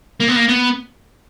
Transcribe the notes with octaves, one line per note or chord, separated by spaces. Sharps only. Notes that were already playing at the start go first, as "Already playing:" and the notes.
A#3
B3
A#3
B3